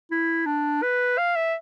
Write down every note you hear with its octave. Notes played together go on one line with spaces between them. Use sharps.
E4
D4
B4
F5
E5